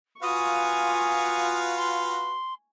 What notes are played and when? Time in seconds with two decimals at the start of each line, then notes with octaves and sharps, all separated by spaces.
0.23 F4 F#4 B4 F5 G#5 C#6 D#6
1.77 C6